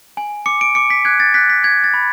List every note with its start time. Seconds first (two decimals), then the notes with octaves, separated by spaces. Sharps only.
0.17 G#5
0.46 D6 C#7
0.61 D7
0.75 D6 C#7
0.90 B6
1.05 F#6 G#6
1.20 A6
1.34 F#6 B6
1.50 B6
1.63 F#6 G#6
1.84 A6
1.94 B5